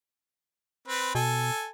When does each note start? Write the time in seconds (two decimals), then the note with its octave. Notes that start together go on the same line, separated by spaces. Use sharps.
0.88 C4 B4
1.15 B2 A4 G#5